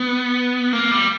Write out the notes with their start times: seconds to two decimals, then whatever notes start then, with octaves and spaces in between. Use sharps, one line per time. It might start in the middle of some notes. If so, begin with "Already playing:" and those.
Already playing: B3
0.73 A#3
0.91 G3